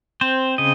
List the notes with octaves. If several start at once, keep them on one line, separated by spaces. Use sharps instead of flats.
C4 C5
C#3 D#5